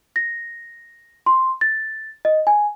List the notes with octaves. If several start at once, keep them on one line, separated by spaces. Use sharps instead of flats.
A#6
C6
A6
D#5
G#5